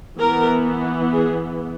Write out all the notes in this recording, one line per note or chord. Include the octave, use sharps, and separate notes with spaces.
E3 B3 A#4
G#4